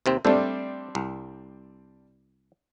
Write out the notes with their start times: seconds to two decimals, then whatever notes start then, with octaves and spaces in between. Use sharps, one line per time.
0.06 D#2 C3 C4
0.25 G3 A3 C4 D4 A4
0.95 C2